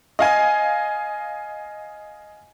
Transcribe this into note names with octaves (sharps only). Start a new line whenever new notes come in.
D#5 F5 G#5